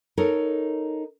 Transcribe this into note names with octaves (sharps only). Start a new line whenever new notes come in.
D#4 A4 A#4 C#5